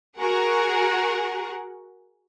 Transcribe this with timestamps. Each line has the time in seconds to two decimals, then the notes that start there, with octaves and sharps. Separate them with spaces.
0.19 F#4 G#4 A#4 F#5